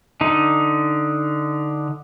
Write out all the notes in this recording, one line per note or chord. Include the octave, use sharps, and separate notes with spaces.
D3 D#4